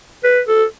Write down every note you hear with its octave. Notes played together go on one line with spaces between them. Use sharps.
B4
A4